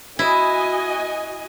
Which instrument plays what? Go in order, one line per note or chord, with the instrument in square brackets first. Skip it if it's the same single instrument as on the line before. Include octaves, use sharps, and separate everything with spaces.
[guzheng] E4 [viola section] F#4 D#5 G#5